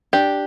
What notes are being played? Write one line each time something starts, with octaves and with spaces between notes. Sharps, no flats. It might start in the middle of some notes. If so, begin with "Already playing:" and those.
D4 G4